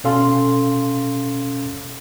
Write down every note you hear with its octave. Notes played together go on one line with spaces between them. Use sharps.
B2 C#4 A4 F5 C6